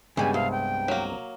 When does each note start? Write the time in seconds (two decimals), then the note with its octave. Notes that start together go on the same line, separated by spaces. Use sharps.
0.17 G2 C#3 G3 G#3 B3 G#5
0.34 C2 F5
0.51 G5
0.88 F#3 A#3